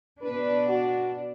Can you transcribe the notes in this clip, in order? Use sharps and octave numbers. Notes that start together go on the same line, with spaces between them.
B2 D4 B4
F#4